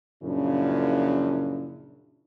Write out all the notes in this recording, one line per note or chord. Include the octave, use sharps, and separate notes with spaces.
F#2 A#2 C#3 F3 D4 E4